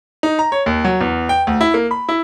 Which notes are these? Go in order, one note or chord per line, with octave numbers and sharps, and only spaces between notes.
D#4
A#5
C#5
D#2
F#3
E2
G5
D2
E4
A#3
B5
E4